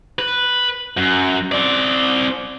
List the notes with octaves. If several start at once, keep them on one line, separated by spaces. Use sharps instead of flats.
B4
F#2
C4 D5